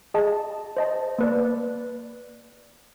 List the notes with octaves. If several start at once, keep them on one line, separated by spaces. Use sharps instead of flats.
G#4 D#5 A5
C5 D#5 A5
A#3 B4 D5